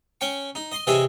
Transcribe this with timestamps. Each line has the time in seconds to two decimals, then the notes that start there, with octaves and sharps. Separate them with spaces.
0.21 C#4 G5 C#6
0.55 D#4
0.72 D#5 C6
0.87 C3 E3 G#4 C#5 D#5 E5